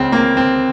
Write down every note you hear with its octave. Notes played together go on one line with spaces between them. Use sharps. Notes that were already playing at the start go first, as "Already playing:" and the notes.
Already playing: C#2 C#3 C4
A#3
C4